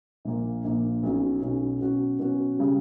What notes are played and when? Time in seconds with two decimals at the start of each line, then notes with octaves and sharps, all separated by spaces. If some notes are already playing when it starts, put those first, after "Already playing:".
0.25 A#1 A#2 A#3
0.64 A#1 A#2 A#3
1.03 B1 B2 F#3 C#4
1.42 B1 B2 F#3 C#4
1.81 B2 F#3 C#4 F#4
2.19 B2 F#3 C#4 F#4
2.59 C#3 G3